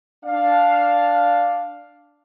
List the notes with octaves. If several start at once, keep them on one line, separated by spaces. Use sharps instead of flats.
D4 F5